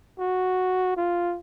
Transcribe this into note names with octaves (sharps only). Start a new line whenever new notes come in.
F#4
F4